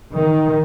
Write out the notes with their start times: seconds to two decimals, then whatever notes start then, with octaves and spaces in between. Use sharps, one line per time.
0.15 D#3